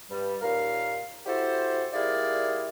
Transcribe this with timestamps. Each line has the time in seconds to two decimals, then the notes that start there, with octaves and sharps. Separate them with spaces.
0.11 G2 G3
0.42 D#2 A#2 A#4 F5
1.27 E4 F#4 G4 A4 C5
1.93 G3 E4 F4 G#4 A#4 D5